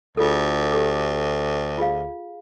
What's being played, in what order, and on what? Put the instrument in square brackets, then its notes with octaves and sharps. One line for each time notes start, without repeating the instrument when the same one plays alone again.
[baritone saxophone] D2 [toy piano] F4 G#4 A4
[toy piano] G4 A4 D6
F4 G#4 F5